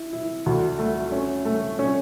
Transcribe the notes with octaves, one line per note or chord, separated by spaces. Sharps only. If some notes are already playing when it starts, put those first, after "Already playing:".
Already playing: E4
E4
D2
A3
C#4
A3
C#4